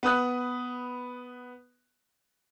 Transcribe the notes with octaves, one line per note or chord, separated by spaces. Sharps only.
B3 B4 D#6 F#6